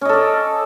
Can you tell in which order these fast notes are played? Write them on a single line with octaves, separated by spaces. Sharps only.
C#4 D#5 A4 D5